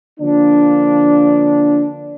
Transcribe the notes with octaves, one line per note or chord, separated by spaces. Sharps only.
D3 F3 A#3 D4